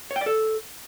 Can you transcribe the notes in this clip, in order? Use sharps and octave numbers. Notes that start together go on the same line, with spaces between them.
C#5
G5
D5
A4